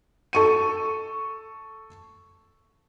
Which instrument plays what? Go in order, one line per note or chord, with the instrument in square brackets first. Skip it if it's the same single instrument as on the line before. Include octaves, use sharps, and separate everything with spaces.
[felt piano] A4 C#6 D#7